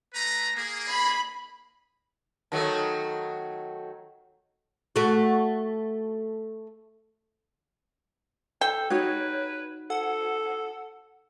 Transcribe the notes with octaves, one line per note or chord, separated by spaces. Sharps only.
A3 B4 A#5
A#3 G#4
B5
D#3 F#3 A3 A4 A5
A3 F#4
A4 G5
D#4 F#4 B4 C#5
A4 F#5